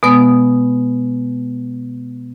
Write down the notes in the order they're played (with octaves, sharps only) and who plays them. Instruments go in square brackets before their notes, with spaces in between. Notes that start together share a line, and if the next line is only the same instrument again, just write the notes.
[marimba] B2 G#3 B3 D#6